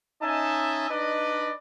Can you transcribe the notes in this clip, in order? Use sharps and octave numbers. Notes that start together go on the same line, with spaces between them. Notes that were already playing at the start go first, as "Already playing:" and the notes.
C#4 D#4 D#5 E5 G#5 A5
D4 D#4 B4 D5 D#5